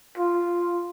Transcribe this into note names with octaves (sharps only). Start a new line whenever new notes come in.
F4